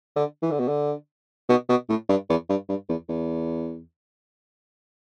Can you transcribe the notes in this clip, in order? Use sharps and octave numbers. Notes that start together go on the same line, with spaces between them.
D3
E3
D3
B2
D3
B2
B2
A2
G2
E2
G2
G2
E2
E2